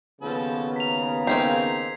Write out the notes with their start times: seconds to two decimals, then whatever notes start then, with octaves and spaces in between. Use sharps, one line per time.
0.22 D#2 C#3 F3 B3 A4 B4
0.76 F5 A#5 B6 F7
1.27 A#3 C4 D#4 G#6 B6 C7